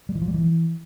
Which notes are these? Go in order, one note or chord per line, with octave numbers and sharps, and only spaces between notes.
G3
E3
F3
G3
E3